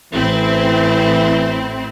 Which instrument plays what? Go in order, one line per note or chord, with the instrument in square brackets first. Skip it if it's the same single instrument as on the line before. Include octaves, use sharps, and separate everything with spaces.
[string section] A1 C4 E4 [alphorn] E3